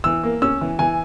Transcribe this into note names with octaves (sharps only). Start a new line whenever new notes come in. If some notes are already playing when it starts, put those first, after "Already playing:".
E3 E6
A#3
C#4 E6
E3
E3 G#5